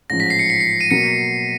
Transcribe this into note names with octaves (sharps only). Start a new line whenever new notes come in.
A1 G#2 F3 A#6
B6
C7
C#7
C7
C7
D#7
B2 F#3 A#3 C#7